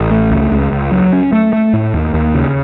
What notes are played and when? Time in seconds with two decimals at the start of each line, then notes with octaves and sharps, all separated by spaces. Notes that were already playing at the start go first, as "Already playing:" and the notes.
Already playing: A1
0.11 A3
0.31 C#2
0.51 C#2
0.72 C#2
0.92 F#3
1.13 C#4
1.33 A3
1.53 A3
1.73 A2
1.94 D#2
2.14 D#2
2.34 C#3